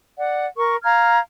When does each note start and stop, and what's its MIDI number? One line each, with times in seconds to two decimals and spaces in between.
0.17 0.46 74
0.17 0.46 78
0.57 0.77 70
0.57 0.77 85
0.83 1.18 77
0.83 1.18 82
0.83 1.18 89
0.83 1.18 92